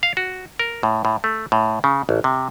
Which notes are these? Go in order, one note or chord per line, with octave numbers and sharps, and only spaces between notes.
F5
F#4
A#4
A2
A2
A3
A2
C#3
A1
C3